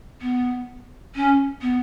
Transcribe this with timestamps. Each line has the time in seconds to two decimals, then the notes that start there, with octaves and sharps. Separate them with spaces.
0.21 B3
1.15 C#4
1.61 B3